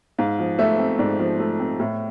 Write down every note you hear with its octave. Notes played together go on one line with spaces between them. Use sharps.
G#2 F5
F3
A3 E5
C4
G#2 D5
F3
A3
C4
A2